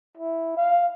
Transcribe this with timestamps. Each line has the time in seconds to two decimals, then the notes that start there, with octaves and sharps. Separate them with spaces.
0.17 E4
0.57 F5